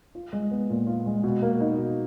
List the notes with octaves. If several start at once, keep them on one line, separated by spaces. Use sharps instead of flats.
F4
G#3
B3
A#2
F4
G#3
B2
A#3
D#4
B2